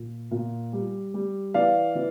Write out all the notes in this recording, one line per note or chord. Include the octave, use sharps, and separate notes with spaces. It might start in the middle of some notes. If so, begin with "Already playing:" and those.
Already playing: A#2
A#2
G3
G3
E3 D5 F5
E3